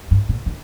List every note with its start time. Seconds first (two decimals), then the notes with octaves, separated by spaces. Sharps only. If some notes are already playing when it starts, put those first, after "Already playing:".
0.11 G2
0.29 A#2
0.46 D3